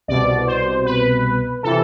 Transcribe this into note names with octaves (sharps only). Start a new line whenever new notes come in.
C2 B2 D5
C5
B4
C3 E3 A4